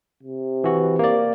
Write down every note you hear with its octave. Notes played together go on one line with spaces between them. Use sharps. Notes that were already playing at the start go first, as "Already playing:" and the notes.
C3
E3 F#4
A#3 D5